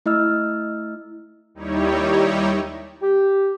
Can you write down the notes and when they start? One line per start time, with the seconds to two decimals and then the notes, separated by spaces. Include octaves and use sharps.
0.06 A3 E4 D#5 E6 F6
1.54 D#2 G3 D#4 E4 G4 C#5
3.02 G4